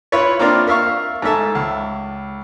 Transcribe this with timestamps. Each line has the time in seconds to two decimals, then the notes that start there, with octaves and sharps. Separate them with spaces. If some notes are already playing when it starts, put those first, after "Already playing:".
0.12 E4 F4 B4 C#5
0.39 A#3 C4 D4 F4 A#4
0.67 A#4 E5 F5 C#6
1.22 G#2 A3 E5 A5
1.55 C#2